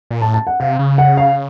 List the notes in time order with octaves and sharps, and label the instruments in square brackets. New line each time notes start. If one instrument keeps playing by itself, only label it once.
[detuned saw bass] A#2
[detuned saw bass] A2 [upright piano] A5
[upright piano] A5
F#5
[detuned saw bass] C3 [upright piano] F5
[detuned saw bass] C#3
[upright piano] F#5
F5